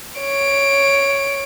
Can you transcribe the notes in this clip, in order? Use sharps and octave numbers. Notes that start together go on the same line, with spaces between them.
C#5 D7